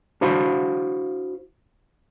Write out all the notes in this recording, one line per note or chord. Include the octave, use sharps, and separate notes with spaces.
D4 E4 F#4 C5 F5 B5